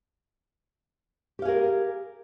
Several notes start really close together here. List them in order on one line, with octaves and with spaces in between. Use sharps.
G4 F5 G#4 A#4